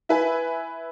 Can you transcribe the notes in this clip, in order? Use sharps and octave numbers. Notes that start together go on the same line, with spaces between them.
E4 B4 G#5